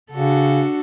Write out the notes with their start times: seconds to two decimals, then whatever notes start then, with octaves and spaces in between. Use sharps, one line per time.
0.12 C#3 D4 F#4 A4